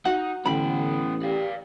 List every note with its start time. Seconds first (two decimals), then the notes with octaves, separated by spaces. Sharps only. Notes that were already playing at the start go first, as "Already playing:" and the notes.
0.05 D#4 F#4 F#5
0.46 A1 D3 B3 G5 B5
1.22 G4 D5 F5